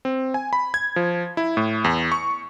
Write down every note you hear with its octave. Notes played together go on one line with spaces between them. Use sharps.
C4
G#5
B5
G#6
F3
E4
A2
E2
C#6